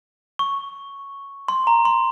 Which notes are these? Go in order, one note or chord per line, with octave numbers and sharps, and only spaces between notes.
C#6
C6
A#5
C6